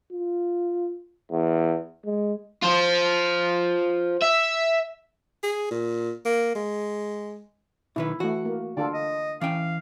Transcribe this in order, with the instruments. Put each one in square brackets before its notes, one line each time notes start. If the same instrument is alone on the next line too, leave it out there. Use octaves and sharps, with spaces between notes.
[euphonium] F4
E2
G#3
[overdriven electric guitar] F4 C5
E5
[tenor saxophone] G#4
A#2
A#3
G#3
[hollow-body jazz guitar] B1 D#3 B4 [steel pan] E4
[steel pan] E3 A3 [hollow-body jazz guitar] F#4
[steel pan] A#3
[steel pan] D3 F4 A4 [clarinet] D5
[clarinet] D#5
[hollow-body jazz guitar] E3 C#4 G5 [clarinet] F5